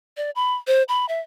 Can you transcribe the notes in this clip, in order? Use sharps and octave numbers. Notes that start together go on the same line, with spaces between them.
D5
B5
C5
B5
E5